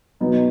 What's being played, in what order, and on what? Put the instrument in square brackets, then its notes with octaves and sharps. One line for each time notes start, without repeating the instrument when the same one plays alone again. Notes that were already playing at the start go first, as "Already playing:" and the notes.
[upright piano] B2 F#3 B3 D#4